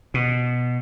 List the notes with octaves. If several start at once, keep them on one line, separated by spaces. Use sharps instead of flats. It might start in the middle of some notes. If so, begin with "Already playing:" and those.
B2